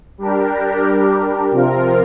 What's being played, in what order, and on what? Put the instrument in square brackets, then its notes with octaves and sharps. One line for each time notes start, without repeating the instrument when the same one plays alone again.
[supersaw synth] G3 D4 G4 A#4
C3 F3 C4 F4 A#4